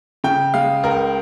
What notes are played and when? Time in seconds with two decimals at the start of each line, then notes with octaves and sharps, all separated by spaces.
0.24 C#3 G5
0.54 G#3 F5
0.83 C#2 A#4